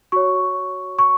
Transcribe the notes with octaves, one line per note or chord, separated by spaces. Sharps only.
F#4 C#5 C#6
C#6